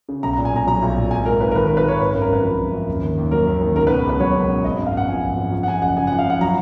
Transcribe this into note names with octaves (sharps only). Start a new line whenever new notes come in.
C#3
B1 A#5
A#5
A#2
G#5
B1 A#5
F#3 A#5
B1
A#2
G#1 G#5
G#2 A#4
G#1 B4
A#4
D#3 B4
A#4
G#1
B4
G#2 C#5
G#1 B4
A#4
F#2
A#4
G#1 B4
F3
G#1
F#2
D#2
D#3
D#2
F#3 A#4
D#2
D#3
C#2 A#4
B4
B2
C#2 B4
F#3 C#5
C#2
B2
G#1 D#5
F#2
F5
G#1 F#5
F3 G#5
G#1
F#2
F3
F#5
F#2 G#5
F#1 F#5
C#3 G#5
F3 F#5
F5
F#2 F#5
F#3 A#5